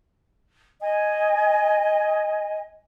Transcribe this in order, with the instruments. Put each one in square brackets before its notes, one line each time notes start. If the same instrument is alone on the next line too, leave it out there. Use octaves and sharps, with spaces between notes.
[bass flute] D#5 [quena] G#5